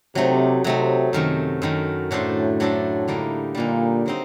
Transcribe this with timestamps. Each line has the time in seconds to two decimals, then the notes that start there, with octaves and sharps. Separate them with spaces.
0.15 C3 F#3 A3 D#4
0.64 C3 F#3 A3 D#4
1.13 F#2 C3 D#3 A3
1.62 F#2 D#3 A3
2.11 A2 F#3 A3 D4 A4 C5
2.60 F#3 A3 D4 A4 C5
3.08 D3 G3 A#3 D#4
3.55 A#2 D3 G3 A#3 D#4
4.06 F#3 C4 D#4